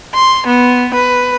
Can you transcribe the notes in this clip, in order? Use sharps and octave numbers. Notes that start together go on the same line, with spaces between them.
C6
B3
B4